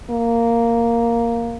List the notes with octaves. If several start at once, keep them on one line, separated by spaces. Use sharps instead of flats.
A#3